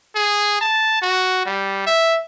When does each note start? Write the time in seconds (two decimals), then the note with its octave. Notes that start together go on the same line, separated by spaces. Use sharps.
0.15 G#4
0.61 A5
1.02 F#4
1.46 G3
1.87 E5